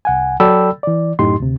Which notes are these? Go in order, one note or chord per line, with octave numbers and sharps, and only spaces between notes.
C2 F#5 G#5
F#3 A4 D5 G5 B5 E6
E3 D5
F#2 A2 D#4 G4 C6
D2 C3